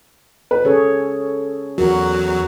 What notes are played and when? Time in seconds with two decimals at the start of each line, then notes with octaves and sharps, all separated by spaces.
0.51 B4
0.65 C#4 G#4 A4 C#5
1.78 E2 F#3 F#4 A#4